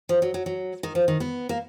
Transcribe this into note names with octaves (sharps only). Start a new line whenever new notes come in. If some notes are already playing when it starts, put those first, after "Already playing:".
F3
F#3
F#3
F#3
D#3
F3
D#3
B3
A#3